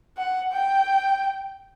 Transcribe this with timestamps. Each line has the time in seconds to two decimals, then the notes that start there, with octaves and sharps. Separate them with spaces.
0.17 F#5
0.53 G5